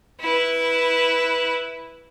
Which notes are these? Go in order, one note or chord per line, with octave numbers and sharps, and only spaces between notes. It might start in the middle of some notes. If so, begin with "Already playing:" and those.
E4 B4